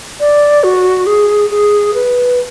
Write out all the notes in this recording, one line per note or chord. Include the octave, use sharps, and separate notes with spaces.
D5
F#4
G#4
G#4
B4